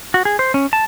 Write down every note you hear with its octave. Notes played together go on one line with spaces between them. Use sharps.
F#4
G#4
C5
C#4
A5